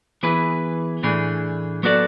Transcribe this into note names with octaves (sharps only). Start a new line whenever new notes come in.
E3 B3 E4 G#4 B4
A2 E3 A3 D4 G#4
F#3 B3 F#4 A4 D5